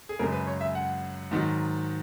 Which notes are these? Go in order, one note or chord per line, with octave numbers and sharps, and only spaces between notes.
G#4
F#2 C#3 G#3 A#4
B4
C#5
E5
F#5
G#2 D#3 F#3